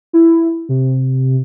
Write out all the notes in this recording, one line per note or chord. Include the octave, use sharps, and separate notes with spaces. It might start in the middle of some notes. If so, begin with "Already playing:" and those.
E4
C3